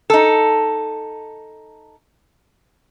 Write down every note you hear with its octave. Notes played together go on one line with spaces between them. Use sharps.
D#4 A4